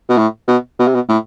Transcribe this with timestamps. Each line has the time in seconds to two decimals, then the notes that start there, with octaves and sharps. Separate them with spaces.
0.09 B2
0.18 A2
0.48 B2
0.79 B2
0.87 C3
0.95 B2
1.08 A2